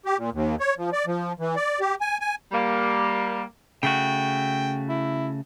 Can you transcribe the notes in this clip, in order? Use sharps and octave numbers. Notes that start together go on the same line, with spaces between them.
G4
A#2
D#2
C#5
F3
D5
F3
E3
D5
G4
G#5
G#5
G3 A#3
C#3 A3 F#4 G5
E4